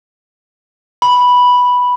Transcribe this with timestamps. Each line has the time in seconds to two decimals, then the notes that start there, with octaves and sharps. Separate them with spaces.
1.02 B5